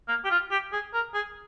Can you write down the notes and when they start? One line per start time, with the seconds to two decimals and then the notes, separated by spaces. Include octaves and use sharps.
0.08 A#3
0.25 G4
0.30 F4
0.51 G4
0.72 G#4
0.94 A#4
1.14 G#4